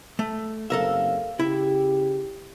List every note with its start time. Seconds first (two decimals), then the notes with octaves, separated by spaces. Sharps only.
0.19 A3
0.70 F#1 C3 A4 A#4 E5 F5
1.40 C#3 E4 G4